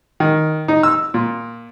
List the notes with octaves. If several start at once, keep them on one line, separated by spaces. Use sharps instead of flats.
D#3
D#4
E6
A#2